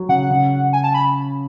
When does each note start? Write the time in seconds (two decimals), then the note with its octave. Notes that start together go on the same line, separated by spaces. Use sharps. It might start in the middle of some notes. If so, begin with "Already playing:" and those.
Already playing: F#3
0.09 C#3 F#5
0.30 C#3
0.73 G#5
0.84 A5
0.94 B5